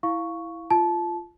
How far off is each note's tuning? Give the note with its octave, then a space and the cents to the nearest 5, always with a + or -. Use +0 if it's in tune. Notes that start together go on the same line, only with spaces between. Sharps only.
E4 +0 F5 +0 C#6 +5
F4 -15 A5 -20